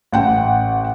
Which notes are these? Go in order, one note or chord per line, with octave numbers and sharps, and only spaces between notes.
A1 F#5 G5